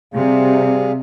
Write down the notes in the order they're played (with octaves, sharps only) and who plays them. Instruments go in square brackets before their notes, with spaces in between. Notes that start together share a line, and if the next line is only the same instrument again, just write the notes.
[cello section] C3 [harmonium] G3 G#4 F5